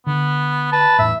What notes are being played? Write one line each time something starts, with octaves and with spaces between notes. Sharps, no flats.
D3 B3
B4 A5
E2 A2 E5